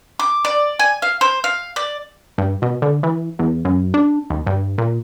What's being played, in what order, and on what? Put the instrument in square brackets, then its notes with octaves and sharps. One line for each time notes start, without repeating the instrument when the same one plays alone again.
[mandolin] D6
D5
G#5
F5
C5
F5
D5
[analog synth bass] G2
B2
D3
E3
E2
F#2
D4
D#2
G2
A#2